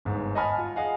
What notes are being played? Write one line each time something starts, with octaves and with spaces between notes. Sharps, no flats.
G1 G#2
D#5 F#5 G#5 A5 B5 F6
F4
G#4 D#5 F5 F#5 G#5